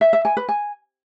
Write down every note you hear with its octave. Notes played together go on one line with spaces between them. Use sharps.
E5
E5
G#5
B4
G#5